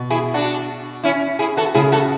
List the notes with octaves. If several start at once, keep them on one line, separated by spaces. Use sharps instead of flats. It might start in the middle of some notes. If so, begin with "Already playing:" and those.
Already playing: B2
E4 G#4
D4 F#4
C#4 E4
E4 G#4
F#4 A4
C#3 E4 G#4
F#4 A4